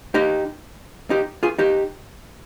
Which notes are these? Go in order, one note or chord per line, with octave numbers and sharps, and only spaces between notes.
D#4 G4
D#4 G4
F4 G#4
D#4 G4